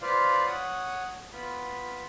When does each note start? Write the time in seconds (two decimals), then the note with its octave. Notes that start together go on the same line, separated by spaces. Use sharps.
0.02 F4 B4 C5 D5 F5
0.46 C#5 F#5 D#6
1.32 B3 F4 B5